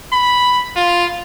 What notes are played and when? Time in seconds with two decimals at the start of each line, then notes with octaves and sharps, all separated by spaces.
0.13 B5
0.76 F4